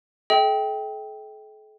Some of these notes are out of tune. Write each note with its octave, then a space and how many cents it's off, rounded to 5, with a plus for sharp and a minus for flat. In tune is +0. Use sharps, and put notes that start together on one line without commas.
A4 -45 E5 -40 G5 +0